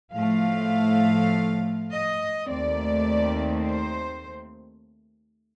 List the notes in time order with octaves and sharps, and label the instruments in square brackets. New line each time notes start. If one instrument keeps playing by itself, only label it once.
[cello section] A2 F3 A3 F5
D#5
D#2 D#3 A3 C4 D5
C5